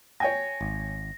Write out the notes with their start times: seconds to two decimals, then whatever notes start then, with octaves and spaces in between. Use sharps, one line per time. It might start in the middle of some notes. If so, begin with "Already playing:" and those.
0.20 C#5 G5 G#5 A#6
0.61 G#1